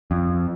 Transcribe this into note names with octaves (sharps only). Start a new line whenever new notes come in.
F2